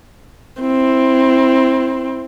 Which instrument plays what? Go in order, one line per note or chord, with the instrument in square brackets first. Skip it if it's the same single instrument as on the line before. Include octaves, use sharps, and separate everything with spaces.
[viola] C4 E4